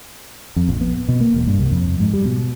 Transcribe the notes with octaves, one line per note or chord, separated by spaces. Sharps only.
F2
A#1
B3
B2
A#3
E1
G2
C2
F2
G#2
G3
B2